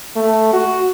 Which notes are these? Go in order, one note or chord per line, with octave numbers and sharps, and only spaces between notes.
A3
F#4